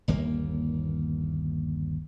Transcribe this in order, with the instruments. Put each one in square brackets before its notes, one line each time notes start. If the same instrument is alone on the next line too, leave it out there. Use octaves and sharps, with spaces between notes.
[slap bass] G1 D#2 A#3